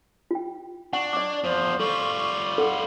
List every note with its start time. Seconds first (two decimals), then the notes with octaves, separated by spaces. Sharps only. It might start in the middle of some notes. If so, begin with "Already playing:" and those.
0.31 F4 G5
0.93 D4 F#5 C#6
1.13 D5 D6
1.44 E2 F3 C5
1.80 G3 F4 A4 C#6
2.58 A4 F#5 D6